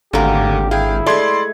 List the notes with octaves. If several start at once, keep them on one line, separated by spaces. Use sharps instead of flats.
G#1 D2 D3 A#3 G4 A#4
E4 G#4 F5 G5
G#3 A3 D5 C6 G#6